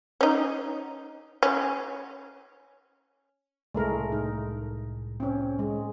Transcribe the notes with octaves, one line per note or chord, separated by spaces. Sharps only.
C#4 D#4
C#4
C2 A2 G#3 A3 A#4
D#4
C4 C#4
G#3